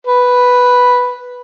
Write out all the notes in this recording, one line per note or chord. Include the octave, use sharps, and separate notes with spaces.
B4